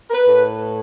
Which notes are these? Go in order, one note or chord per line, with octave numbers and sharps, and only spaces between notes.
A#4
B4
A2